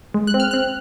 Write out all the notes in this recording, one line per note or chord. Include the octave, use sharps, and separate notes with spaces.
G#3
F#6
C4
F6
F#6
C4